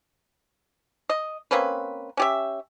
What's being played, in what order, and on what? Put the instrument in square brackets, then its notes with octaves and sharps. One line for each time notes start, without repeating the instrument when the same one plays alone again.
[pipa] D#5
A#3 C4 C#4 B4
C#4 G4 E5